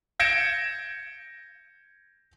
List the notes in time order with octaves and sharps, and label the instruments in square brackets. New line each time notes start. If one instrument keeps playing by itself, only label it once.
[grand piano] G6 G#6 A#6 C#7 D7 E7